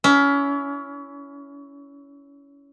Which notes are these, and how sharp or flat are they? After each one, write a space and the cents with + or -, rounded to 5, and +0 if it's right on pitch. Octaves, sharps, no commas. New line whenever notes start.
C#4 +25 E4 +0